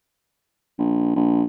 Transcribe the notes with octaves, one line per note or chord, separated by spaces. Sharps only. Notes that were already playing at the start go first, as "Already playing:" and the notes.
A#1
A#1